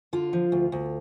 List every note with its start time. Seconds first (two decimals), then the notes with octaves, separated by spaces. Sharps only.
0.13 D3 F4
0.33 F3
0.52 D2
0.72 D2